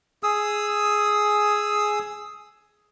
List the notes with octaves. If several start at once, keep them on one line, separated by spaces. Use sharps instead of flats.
G#4 D#6 E6